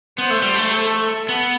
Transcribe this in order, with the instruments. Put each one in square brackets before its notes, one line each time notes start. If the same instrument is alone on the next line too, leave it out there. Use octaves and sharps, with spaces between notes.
[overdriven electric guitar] B3 [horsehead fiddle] C5
[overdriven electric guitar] A3
G3
A3
[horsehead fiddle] A4
[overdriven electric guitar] B3